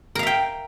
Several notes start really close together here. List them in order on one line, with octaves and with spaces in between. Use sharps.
A#4 F5 E5 G5